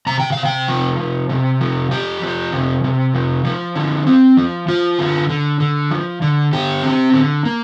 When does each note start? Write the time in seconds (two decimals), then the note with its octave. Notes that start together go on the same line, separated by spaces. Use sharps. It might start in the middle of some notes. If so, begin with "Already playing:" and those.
0.06 C3 A#5
0.20 G5
0.32 C3 F5
0.45 G5
0.68 F3
0.99 C3
1.29 C3
1.61 F3
1.91 F3 G4
2.22 F3
2.53 C3
2.84 C3
3.14 F3
3.45 F3
3.75 D3
4.07 C4
4.37 F3
4.68 F3 F4
4.99 D3
5.30 D3
5.60 D3
5.91 F3
6.22 D3
6.53 D3 G4
6.83 C4
7.14 D3
7.45 A#3